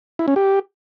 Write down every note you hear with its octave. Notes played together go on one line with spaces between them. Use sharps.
E4
C#4
G4